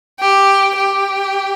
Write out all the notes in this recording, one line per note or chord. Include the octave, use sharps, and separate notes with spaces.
G4
G4